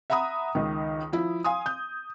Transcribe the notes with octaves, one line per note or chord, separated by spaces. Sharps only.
E5 F#5 A#5 B5 D#6
C#2 D#3
F3 E4
F5 G#5 C6 D#6
G6